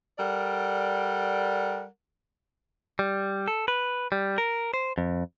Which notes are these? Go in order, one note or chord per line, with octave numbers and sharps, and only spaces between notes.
G3 A4 A#4 D5 F#5
G3
A4
B4
G3
A#4
C5
F2